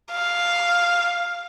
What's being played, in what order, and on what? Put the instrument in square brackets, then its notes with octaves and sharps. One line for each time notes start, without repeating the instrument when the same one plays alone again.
[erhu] F5